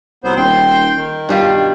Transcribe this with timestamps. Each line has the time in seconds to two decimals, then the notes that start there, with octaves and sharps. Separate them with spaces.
0.24 C2 F#3 B3 C5
0.37 D#1 G5 C6
0.96 D#3
1.29 G2 B2 G3 F4